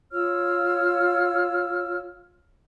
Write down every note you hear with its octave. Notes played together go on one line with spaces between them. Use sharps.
F4 C#5 E6 F6